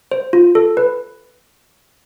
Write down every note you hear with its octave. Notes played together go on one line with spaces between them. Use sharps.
C5
F4
A4
B4